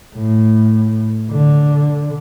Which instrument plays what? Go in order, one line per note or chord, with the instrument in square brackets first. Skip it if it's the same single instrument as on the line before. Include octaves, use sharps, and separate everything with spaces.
[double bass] A2
D3